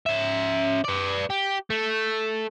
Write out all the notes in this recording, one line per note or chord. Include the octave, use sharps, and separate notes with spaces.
C#4 E5
B4 D5
G4
A3